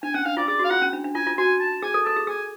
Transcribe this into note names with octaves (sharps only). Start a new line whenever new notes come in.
D4 G#5
C#4 F#5
D4 F5
F4 D5
G#4 D5
F#4 F5
F4 F#5
C#4
D4
D4
F4 G#5
F4
F#4 G#5
A5
G#4 G#5
A4
A4 A5
G#4
G#4 G#5